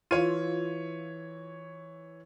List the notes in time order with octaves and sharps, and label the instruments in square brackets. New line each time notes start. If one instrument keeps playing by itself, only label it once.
[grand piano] E3 C#5 D#7 [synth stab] F4